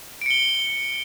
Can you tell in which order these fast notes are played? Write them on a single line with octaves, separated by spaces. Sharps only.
D7 C#7 G7